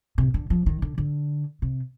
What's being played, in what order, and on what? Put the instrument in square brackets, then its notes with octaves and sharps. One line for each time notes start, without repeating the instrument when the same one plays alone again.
[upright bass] C3
D3
F3
D#3
D3
D3
C3